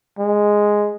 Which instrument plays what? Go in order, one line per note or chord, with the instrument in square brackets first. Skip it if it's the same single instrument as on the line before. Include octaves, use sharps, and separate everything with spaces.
[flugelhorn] G#3